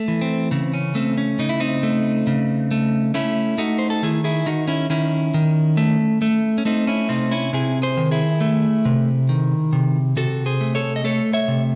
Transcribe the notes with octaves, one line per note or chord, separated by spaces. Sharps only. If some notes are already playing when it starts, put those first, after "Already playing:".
Already playing: A3
E3
C4
C#3 C4
C#4
A3 C4
C#4
C#3 D#4
E4
C4 D#4
A3
C#3
A3
A3 C#4 E4
A3 D#4 F#4
C5
A4
D#3 E4 G#4
E4 G#4
D#3 D#4 F#4
C#4 E4
D#3 C#4 E4
D#3
A3
A3
C#4
A3 C4 D#4
C#4 E4
C3 C4 D#4
C#4 E4
C3 E4 G#4
G#4 C5
D#3
E4 G#4
A3
C3
D#3
C3
C3 F#4 A4
G#4 C5
A3
A4 C#5
D#5
A3 A4 C#5
C#5 E5
C3